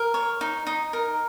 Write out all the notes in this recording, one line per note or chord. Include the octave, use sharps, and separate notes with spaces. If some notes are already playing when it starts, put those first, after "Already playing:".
Already playing: A#4
C#5
D#4
D#4
A#4